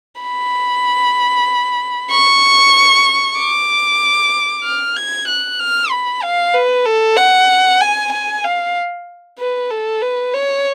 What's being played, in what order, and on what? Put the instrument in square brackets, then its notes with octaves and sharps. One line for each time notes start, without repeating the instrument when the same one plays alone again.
[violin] B5
C#6
D6
F6
G#6
F#6
F6
B5
F5
B4
A4
F#5
G#5
G#5
F5
B4
A4
B4
C#5